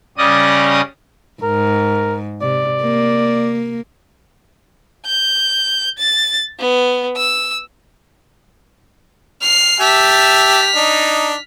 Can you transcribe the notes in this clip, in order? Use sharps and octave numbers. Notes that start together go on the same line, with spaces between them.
C#3 G3 C#4 D5 D#5 D#6
G#2 A#4
C3 D5
A#3
G6
A6
B3
E6
F6 C7
G4 E5 A5 F6 B6
D4 D#4